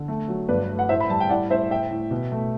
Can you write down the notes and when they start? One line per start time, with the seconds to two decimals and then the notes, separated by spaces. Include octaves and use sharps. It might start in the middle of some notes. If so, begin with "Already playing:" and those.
Already playing: D3 A4
0.08 A3
0.28 F#3
0.49 G2 B4 D5
0.69 A3
0.79 F#5
0.89 A2 C5 E5
1.00 B5
1.09 G3 A5
1.20 G5
1.30 A2 D5 F#5
1.50 A2 C5 E5
1.70 A2 E5 G5
1.91 A2
2.11 B2
2.32 A3